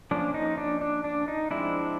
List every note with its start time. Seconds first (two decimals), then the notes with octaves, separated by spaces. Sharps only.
0.11 F3 A#3 C#4 D4
0.34 D#4
0.58 D4
0.81 D4
1.04 D4
1.28 D#4
1.51 F3 G#3 C4 D4 E4